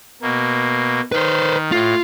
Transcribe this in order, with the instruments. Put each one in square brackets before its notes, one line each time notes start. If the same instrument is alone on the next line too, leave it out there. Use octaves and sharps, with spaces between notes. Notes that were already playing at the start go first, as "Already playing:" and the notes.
[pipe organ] B2 A#3
[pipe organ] D#3 [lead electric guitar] B4 C5
[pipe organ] A2 [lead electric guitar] F4